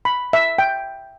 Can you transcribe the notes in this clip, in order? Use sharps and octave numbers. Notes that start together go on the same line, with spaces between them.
B5
E5
G5